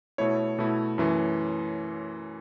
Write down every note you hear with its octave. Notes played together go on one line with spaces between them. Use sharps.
B2 A3 E4 C#5
B2 A3 E4
F#2 E3 A3